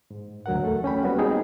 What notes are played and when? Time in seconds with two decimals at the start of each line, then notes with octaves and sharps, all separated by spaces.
0.11 G#2
0.46 D2 F#3 A#4 F#5
0.62 E2 A3 A4
0.84 C#4 G5 B5
1.03 G3 A#3 B3 C#4 F#4 B4
1.18 G#3 C4 D#4 G#4 G5